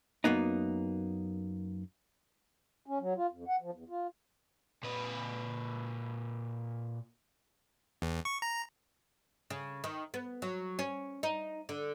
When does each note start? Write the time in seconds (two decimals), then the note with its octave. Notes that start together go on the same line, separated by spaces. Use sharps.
0.24 F#2 A#3 B3 D#4
2.86 C#4
3.00 F#3
3.17 F4
3.31 F2
3.48 F#5
3.61 F3
3.73 E2
3.89 F4
4.83 A#2 B4
8.02 E2
8.25 C#6
8.42 A#5
9.50 C#3
9.84 D#3
10.14 B3
10.42 F#3
10.79 C#4
11.23 D#4
11.69 D3